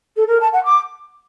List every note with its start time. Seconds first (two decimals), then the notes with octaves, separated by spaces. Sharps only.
0.17 A4
0.29 A#4
0.40 A5
0.52 F#5
0.64 D6